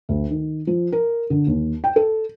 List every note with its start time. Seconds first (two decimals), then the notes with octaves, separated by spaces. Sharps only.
0.09 D2
0.30 D#3
0.67 F3
0.92 A#4
1.30 D3
1.47 D#2
1.84 G5
1.96 A4